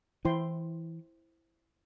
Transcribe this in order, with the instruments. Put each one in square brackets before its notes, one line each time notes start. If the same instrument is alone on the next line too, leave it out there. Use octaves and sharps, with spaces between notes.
[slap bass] E3 [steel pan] E4 C5 G5 C6